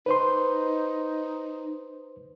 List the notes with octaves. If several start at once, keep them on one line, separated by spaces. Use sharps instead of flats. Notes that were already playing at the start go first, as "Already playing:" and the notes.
D#4 B4 C5 C6